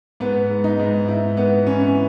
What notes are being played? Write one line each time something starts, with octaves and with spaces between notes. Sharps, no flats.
G#2 B3
G#2
D#4
G#2
G#2 E4
G#2 B3
E3 C#4